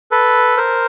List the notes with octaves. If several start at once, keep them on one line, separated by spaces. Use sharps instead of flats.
A4 B4
A#4 C5